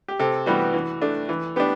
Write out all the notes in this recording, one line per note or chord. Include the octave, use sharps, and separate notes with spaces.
G4
C3 A4
E3 G3 B3 F#4
E3
A3 D4
E3
B3 D4 G4